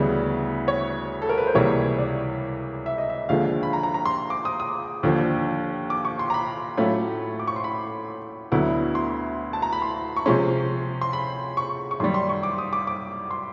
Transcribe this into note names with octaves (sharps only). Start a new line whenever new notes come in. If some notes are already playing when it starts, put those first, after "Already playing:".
Already playing: D2 C#3 E3 G3 B3
C#5
A4
A#4
B4
C5
C#2 C3 E3 G3 A#3 C#5
D5
E5
D#5
E5
D#2 D3 F3 G#3 F5
B5
A#5
A#5
A#5
C6
D6
D#6
D#6
D#2 D3 F3
D6
C#6
C6
A#5
B5
A2 F#3 A3 C#4 F4 B5
D6
C#6
C6
B5
D2 D3 F#3 B3 E4
C6
A5
A#5
B5
C6
C#6
C3 F3 G#3 C#4 C6
C6
B5
C#6
C#6
F#2 D#3 G3 C6
C6
C#6
D6
D#6
D6
D6
C6